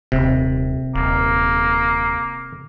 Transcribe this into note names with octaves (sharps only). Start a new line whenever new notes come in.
D#1 C3
D#1 A#3